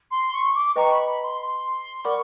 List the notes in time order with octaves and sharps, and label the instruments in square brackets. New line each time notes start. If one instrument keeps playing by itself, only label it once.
[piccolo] C6
C#6
D6
[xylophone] B4 D#5 G5 A#5 [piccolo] C#6
[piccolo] B5
B5
C6
C6
[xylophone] A#4 D5 F#5 B5 D6 [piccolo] C#6